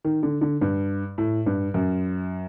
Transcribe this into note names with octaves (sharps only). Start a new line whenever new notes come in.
D#3
D3
D3
G2
A2
G2
F#2